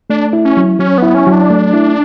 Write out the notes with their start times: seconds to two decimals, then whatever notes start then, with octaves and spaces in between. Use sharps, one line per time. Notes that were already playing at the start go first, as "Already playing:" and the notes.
0.10 A3 D4
0.33 E4
0.45 C#4
0.57 F#3
0.79 F#3 C#4
0.98 B3 E4
1.15 C#4
1.27 F#3
1.32 D4
1.50 A3
1.74 E4